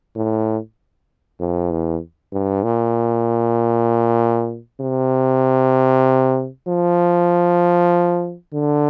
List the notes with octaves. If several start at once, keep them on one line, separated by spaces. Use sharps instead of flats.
A2
F2
E2
G2
A#2
C3
F3
D3